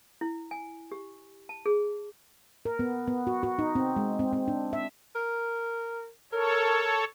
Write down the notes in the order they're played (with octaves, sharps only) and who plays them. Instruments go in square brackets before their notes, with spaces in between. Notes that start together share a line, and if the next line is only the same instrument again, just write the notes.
[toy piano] E4
G#5
G4
A5
G#4
[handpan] A#4
B3
B3
F#4
F#4
D#4
C4
G#3
C4
C4
D4
E5
[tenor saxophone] A#4
[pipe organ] A4 C#5 [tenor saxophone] A#4